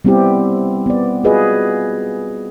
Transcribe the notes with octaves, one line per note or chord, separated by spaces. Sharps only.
G3 B3 C4 E4 G4
B3 D5
F4 F#4 G#4 B4 D#5